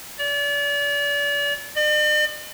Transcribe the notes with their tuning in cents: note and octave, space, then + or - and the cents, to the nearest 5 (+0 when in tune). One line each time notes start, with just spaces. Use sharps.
D5 -35
D5 +45